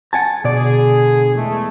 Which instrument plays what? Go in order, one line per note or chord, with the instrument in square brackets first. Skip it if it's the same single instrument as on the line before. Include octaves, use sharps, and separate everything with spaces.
[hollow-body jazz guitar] F#5 G#5 A5
[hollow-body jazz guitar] B2 D5 [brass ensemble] D3 G#4
[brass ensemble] E2 G#3 A3